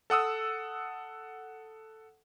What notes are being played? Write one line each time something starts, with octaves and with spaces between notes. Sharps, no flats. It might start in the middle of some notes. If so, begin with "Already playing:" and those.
A4 F#5 D#6 E6